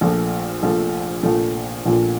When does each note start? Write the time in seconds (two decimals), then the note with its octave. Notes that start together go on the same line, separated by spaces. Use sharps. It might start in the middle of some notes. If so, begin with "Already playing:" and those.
0.01 A#1 A#2 F3 A3
0.63 A#1 A#2 F3 A3
1.23 A#1 A#2 F3 A3
1.86 A#1 A#2 F3 A3